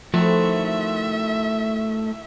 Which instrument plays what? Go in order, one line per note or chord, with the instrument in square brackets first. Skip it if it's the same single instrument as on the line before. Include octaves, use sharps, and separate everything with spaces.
[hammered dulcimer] A2 D#3 C4 [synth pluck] F3 [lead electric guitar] A3 F#4 [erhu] E5